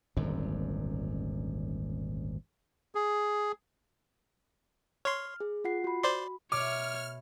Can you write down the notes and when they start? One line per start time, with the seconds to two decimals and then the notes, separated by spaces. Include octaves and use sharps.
0.16 D#1 G#1 F#2 D3
2.95 G#4
5.05 C#5 C6 F6
5.40 G#4
5.64 F4 F#5 C7
5.84 F#4 B5
6.03 C5 D5 C6
6.52 B2 A3 C#5 D6 F6